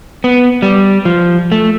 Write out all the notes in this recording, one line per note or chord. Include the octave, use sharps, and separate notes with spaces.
B3
G3
F3
A3